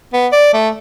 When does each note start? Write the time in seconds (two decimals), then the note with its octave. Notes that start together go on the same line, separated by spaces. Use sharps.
0.13 B3
0.32 D5
0.53 A3